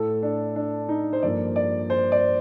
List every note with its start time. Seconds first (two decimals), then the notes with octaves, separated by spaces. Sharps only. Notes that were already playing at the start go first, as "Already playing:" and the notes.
Already playing: A2 A3 A4
0.23 D4
0.56 D4
0.89 D#4
1.13 C5
1.22 G2 F3 A#3 D5
1.56 D5
1.90 C5
2.12 D5